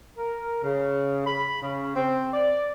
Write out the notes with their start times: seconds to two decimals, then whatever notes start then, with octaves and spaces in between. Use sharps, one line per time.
0.17 A#4
0.62 C#3
1.26 B5
1.61 C#3
1.95 C4
2.32 D5